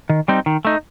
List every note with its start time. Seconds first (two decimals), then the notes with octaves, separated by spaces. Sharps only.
0.09 D#3
0.28 G3 C4 D#4
0.46 D#3
0.65 A3 D#4